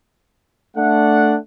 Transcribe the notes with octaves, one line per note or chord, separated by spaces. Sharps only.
A3 D4 F#5